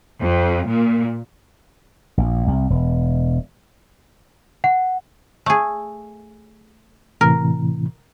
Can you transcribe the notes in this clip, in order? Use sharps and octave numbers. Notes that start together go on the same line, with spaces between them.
F2
A#2
A#1
C2
E1
F#5
A3 G#4
A2 C3 E3 A#4